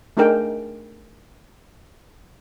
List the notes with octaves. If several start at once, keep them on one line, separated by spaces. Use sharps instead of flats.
A3 D4 D#4 G#4 A#4 G5